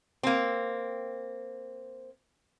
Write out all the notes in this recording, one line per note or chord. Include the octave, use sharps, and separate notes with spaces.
A#3 C4